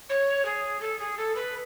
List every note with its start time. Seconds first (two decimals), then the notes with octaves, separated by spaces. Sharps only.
0.09 C#5
0.45 G#4
0.80 A4
0.99 G#4
1.17 A4
1.35 B4